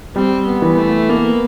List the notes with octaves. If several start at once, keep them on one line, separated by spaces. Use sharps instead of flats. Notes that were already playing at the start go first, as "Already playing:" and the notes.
G3 C4
B3
E3
A3
A#3 B3